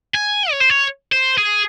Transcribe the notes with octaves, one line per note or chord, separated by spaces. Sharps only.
G#5
C#5
C5
C#5
C5
G#4